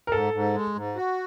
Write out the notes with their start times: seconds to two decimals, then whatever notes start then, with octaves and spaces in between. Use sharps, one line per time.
0.07 A#4
0.12 G#2 A4
0.33 G#2
0.55 G#3
0.75 G#2
0.96 F#4